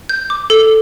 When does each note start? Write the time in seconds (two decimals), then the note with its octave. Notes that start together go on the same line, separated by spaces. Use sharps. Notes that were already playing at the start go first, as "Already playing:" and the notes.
0.09 G6
0.30 D6
0.50 A4